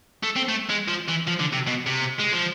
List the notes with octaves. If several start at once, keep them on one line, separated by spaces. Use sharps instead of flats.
A3
C4
A3
G#3
F3
E3
F3
D3
C3
B2
C3
G#3
F3